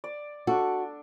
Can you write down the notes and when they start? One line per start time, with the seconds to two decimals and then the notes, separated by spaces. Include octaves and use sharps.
0.04 D5
0.47 D4 F#4 A4